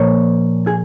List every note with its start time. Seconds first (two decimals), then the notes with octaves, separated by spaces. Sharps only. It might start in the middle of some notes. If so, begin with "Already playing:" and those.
Already playing: A#2 F3 A#3 C#5
0.67 G#4